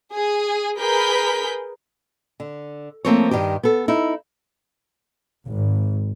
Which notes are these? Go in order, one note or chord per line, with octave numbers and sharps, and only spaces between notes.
G#4
G#4 A#4 B4 G6 B6
D3
F3 A3 A#3 C4 C5 C#5
G2 D#3 G4
B3 A4
D#4 E4
G#1